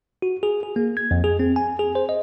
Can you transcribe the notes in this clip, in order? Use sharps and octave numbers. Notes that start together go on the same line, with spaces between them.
F#4
G#4
G#4
A#3
G#6
F2
G#4
C4
G#5
G#4
C5
D#5